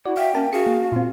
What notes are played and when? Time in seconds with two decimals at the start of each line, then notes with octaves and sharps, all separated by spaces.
0.06 E4 F#4 D5
0.17 E5 F5 G5
0.35 A#3 C#4 A5
0.53 F#4 G#4 F5 C#7
0.67 A#3
0.92 A#2 C4 F4